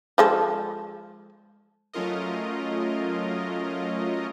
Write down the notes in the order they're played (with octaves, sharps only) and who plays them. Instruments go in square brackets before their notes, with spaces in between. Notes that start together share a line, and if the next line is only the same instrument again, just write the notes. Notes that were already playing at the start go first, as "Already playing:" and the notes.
[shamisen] F3 G#3 A4
[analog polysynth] F#3 A3 C#4 F4 A#4 D#5